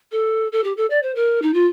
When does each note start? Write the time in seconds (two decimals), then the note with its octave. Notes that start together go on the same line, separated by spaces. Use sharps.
0.12 A4
0.52 A4
0.64 G4
0.77 A4
0.90 D5
1.03 C5
1.15 A#4
1.42 D#4
1.54 F4